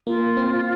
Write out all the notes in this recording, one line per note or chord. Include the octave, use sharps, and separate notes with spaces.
A#3 F4
C4